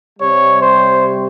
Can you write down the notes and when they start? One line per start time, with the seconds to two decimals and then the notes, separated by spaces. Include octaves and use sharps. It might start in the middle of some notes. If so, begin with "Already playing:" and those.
0.19 C3 G3 C#5
0.60 C5